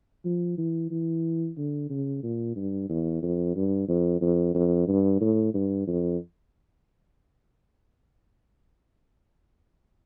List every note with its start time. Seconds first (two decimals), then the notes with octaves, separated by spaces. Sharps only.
0.25 F3
0.58 E3
0.91 E3
1.57 D3
1.90 C#3
2.23 A#2
2.56 G2
2.89 E2
3.22 F2
3.55 G2
3.88 F2
4.21 F2
4.54 F2
4.88 G2
5.21 A2
5.54 G2
5.87 F2